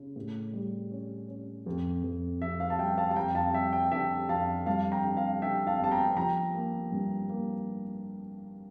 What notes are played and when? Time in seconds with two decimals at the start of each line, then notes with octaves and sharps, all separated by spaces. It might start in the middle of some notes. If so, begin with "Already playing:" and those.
Already playing: C#3
0.16 A2
0.53 G3
0.91 C#4
1.28 C#4
1.66 F2
2.04 F2
2.42 F2 E5
2.60 F5
2.70 A5
2.79 G3 E5 G5
2.98 F5 A5
3.11 A5
3.16 F2 G5 A#5
3.35 F5 A5
3.54 G3 E5 G5
3.73 E5 G5
3.92 D3 E5 G5
4.29 F2 F5 A5
4.66 G2 F5 A5
4.92 G5 A#5
5.04 D3
5.17 F5
5.42 D3 E5 G5
5.67 F5 A5
5.79 G1 A5
5.91 G5 A#5
6.17 F3 G5 A#5
6.54 A#3
6.92 G2
7.29 A#3